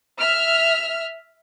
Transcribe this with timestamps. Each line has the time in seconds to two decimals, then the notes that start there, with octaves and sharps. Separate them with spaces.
0.19 E5 F6